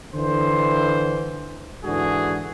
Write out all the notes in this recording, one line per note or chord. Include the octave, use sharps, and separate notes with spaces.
D3 E3 C5
G#2 D3 E3 F#4 G#4